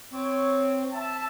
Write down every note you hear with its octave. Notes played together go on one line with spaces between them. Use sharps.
C4 C#5
E5 A5